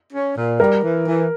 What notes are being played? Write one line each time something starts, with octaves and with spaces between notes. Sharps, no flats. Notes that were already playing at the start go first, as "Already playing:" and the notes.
C#4
A#2
G3 A#4
E3
E3